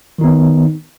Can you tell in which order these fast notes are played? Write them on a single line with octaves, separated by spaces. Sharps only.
D#3 D#4 B3